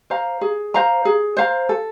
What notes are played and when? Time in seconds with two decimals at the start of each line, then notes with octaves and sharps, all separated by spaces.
0.10 C5 F5 A#5
0.41 G#4
0.74 C5 F5 A#5
1.05 G#4
1.37 C5 F5 A#5
1.69 A4